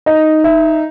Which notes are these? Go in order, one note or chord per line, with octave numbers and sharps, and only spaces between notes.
D#4 D#5
E5